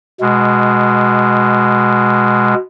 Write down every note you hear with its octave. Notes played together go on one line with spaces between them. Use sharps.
B2 G#3